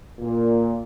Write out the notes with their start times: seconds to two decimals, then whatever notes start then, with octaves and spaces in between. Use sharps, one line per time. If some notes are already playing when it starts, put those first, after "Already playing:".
0.20 A#2